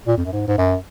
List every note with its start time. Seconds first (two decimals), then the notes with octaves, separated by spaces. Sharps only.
0.08 A#2
0.18 F2
0.25 F#2
0.33 G#2
0.48 G#2
0.58 F#2